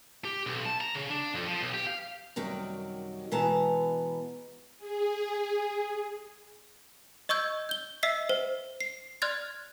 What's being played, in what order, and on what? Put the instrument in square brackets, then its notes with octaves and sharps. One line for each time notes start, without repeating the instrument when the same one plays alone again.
[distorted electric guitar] G4
B1
A5
A#5
C#3
D4
F2
F3
B1
G4
F5
[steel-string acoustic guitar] F#2 C3 D#3 G3 F#4
B2 E3 G#3 B3 A5 A#5
[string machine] G#4
[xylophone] D#5 C#6 E6 G6 G#6
G6 G7
D#5 E5 E6 B6 C7
C5
C7
D5 C6 F6 F#6 G#6 A6